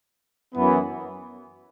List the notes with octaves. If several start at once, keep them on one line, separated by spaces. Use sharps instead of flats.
F#2 E3 B3